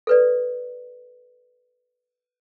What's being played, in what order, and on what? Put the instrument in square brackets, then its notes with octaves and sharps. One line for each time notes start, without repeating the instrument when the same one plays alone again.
[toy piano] A4 B4 D5